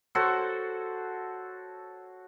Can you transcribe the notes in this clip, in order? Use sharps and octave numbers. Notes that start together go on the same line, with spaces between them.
F#4 A4 C5 C#5